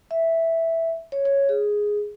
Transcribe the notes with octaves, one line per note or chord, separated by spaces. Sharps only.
E5
C#5
C#5
G#4